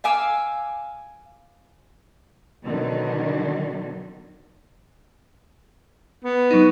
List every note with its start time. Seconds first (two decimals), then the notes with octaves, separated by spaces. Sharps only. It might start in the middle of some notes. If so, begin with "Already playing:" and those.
0.04 F5 G#5 D6 E6
2.64 B2 D3 D#3 F#3 D4
6.24 B3
6.51 F#3 D#4